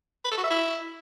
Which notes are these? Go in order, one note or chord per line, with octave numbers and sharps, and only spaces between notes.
B4
A4
F#4
E5
E4